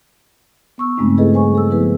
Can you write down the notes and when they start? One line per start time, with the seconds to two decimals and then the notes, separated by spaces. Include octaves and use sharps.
0.78 B3 C#6 E6
0.97 G2 C#3 G#3 A3 C4 D#4
1.17 E4 G#4 A4 B4 D#5
1.33 G3 C5 G#5 C#6
1.55 A4 E6
1.70 F3 B3 E4 G#4 B4